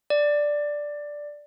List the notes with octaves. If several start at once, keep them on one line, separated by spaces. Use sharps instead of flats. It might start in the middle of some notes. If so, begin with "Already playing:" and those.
D5